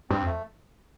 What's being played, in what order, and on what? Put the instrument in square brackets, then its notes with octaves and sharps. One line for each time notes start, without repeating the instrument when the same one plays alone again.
[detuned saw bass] G2 [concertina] C4
[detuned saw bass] F2
[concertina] A3